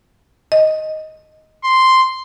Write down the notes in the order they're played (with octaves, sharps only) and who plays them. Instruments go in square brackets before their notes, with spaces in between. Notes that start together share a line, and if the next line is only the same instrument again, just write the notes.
[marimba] D#5
[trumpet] C6